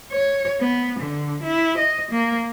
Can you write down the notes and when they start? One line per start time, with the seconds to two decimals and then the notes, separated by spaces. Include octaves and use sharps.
0.12 C#5
0.60 B3
1.00 D3
1.43 E4
1.78 D#5
2.11 A#3